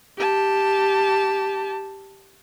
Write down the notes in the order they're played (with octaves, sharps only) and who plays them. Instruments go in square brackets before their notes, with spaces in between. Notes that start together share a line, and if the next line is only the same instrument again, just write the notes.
[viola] G4 A5